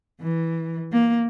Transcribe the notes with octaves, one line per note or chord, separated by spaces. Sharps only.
E3
A#3